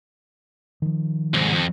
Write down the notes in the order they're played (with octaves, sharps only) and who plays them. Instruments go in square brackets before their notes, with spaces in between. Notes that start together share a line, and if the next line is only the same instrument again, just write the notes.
[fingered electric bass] D#3 F3
[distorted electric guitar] C2 G#2
F2